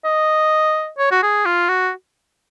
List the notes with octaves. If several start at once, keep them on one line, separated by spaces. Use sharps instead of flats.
D#5
C#5
F#4
G#4
F4
F#4